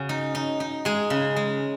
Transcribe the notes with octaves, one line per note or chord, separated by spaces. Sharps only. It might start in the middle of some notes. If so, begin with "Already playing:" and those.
Already playing: C#3 F#4
D#4
D#4
D#4
G#3 G#4
C#3
G#3